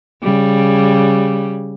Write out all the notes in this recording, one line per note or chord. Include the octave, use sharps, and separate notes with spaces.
C#3 G3